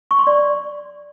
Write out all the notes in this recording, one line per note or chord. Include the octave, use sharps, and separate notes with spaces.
C#6
C6
D5